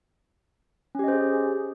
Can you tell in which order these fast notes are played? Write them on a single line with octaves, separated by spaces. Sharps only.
C#4 G4 D#5 C5 G#4